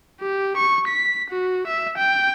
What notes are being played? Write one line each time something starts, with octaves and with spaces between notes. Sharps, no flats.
G4
C#6
B6
F#4
E5
G5